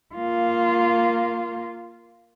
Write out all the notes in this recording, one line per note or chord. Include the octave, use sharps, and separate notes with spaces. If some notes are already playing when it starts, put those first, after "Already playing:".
A#3 F4